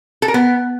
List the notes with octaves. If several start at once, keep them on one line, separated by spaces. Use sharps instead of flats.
A4
A#4
B3